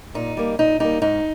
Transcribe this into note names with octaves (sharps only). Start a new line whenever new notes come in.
A#2 D#4
G3 A#3
A#2 D#4
G3 A#3 D#4
G#2 D#4